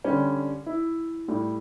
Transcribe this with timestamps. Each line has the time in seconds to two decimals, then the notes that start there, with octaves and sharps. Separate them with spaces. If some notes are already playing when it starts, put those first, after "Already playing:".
0.04 D3 G3 C#4
0.66 E4
1.28 A2 G3